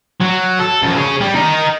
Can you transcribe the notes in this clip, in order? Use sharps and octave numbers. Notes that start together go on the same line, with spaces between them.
F#3
A4
F#2 F3
G#4 C#5
G3
D#4 A#4